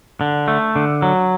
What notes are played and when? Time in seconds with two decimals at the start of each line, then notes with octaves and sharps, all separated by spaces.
0.21 D3
0.48 A3
0.76 D3
1.02 F#3